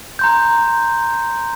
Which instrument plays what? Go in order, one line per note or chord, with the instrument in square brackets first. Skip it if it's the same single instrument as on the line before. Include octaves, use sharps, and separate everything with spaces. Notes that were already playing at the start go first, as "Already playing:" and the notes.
[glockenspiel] A#5 C6 G6